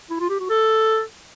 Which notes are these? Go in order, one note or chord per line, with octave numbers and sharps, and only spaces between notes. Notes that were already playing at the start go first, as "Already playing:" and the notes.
E4
F4
G4
F#4
A4